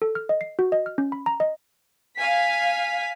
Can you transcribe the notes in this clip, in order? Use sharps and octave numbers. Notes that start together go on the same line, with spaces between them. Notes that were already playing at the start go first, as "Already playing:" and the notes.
A4
F6
D#5
C7
F#4
D#5
F6
C#4
B5
A#5
D#5
F5 G#5 B6